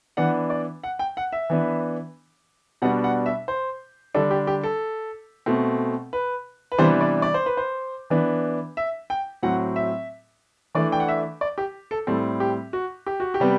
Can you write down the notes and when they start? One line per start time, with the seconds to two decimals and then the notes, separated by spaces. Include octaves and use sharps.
0.17 E3 B3 D4 F#5
0.50 D5
0.83 F#5
0.99 G5
1.17 F#5
1.32 E5
1.50 E3 B3 D4
2.82 B2 G3 B3 D4 F#5
3.04 F#5
3.26 E5
3.48 C5
4.14 D3 G3 D4 A4
4.31 G4
4.47 G4
4.64 A4
5.46 B2 A3 C4
6.13 B4
6.72 B4
6.78 C3 E3 G3 B3 D4 C5
7.01 D5
7.22 D5
7.34 C5
7.46 B4
7.57 C5
8.10 E3 B3 D4
8.77 E5
9.10 G5
9.43 A2 F#3 C4 F#5
9.76 E5
10.75 E3 A3 D4 D5
10.92 G5
11.00 F#5
11.08 E5
11.41 D5
11.58 G4
11.91 A4
12.07 A2 G3 C4 A4
12.40 G4
12.73 F#4
13.06 G4
13.20 F#4
13.34 G4
13.40 C3 G3 B3